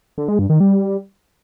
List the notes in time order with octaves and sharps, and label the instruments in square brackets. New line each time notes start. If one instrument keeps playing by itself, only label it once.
[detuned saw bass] D3
G#3
G2
D#3
G3